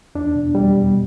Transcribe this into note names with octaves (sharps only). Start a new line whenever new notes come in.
E2 D4
B2
E2 G3
B2